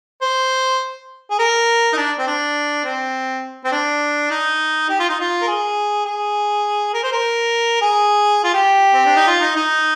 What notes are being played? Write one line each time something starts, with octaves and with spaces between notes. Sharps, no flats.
C5
G#4
A#4
D#4
D4
C4
D4
C4
C4
D4
D#4
G4
F4
D#4
F4
A#4
G#4
G#4
A#4
C5
A#4
G#4
F4
G4
C4
D4
D#4
F4
D#4
D#4